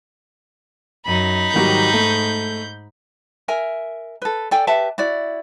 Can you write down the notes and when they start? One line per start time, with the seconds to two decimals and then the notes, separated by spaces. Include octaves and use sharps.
1.06 F#2 D#4 B5
1.54 G#2 D#3 F#3 G3 G6
1.93 A3
3.48 A#4 E5 G#5
4.22 A4 B4
4.51 A4 D5 G5 G#5
4.67 G4 B4 E5 A5
4.98 E4 F#4 D5